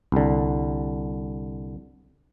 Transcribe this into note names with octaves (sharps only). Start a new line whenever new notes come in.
C2 D3